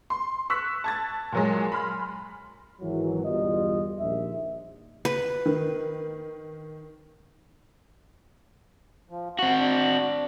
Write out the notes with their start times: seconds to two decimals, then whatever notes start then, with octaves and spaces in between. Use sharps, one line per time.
0.10 C6
0.50 C#6 E6 F#6 B6
0.84 A5 G#6 A6
1.33 A#2 F#3 G#3
1.72 B5 C6 F6
2.81 G#1 E3 F#3
3.25 G1 E2 B2 G3 F4 D#5
4.00 A#1 D#2 E5
5.05 B4
5.46 D#3
9.10 F3
9.39 C4 F#4 F#5
9.58 D4